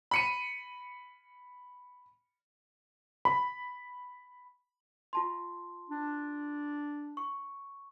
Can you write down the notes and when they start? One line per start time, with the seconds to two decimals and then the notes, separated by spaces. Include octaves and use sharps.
0.11 B5 C#7 D#7
3.25 B5
5.13 F4 A5 C6
5.89 D4
7.17 C#6